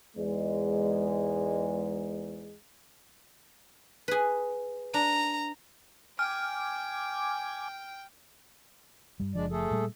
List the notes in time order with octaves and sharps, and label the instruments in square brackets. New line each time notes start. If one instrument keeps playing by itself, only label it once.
[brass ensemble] E2 G#2 G#3
[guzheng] G#4 B4
[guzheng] D4 [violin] A#5
[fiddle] G5 [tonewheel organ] G#5 D6 [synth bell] F6
[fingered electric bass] G2 G3
[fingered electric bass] F#1 F3 [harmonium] G#3 D4 D5
[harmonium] A3 G#4 A4
[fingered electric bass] A#2 G3